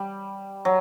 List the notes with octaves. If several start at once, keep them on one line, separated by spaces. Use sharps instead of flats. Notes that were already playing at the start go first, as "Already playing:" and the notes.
Already playing: G3
F#3